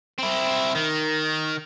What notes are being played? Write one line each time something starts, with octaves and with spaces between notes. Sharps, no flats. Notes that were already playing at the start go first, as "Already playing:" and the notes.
C4 E4
D#3